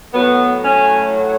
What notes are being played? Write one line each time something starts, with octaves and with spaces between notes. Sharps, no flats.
A2 F#3 B3
C#4